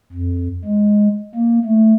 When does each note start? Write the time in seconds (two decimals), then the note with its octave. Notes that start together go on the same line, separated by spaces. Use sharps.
0.12 F2
0.65 G#3
1.35 A#3
1.65 A3